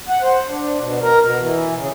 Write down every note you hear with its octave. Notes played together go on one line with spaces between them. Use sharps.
F#5
C5
D4
B2
A#4
B2
E3
C#3